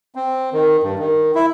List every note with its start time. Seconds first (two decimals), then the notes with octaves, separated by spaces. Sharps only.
0.15 C4
0.53 D#3
0.83 G2
0.99 D#3
1.35 E4